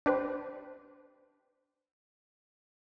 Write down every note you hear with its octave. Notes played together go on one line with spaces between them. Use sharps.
D4 G4 B4 C5